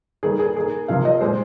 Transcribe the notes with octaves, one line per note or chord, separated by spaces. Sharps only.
D#3 G3 A#3 G#4
G#4
D#3 A#3 G#4
C3 F3 A#3 F5
D#5
A#2 G#3 C5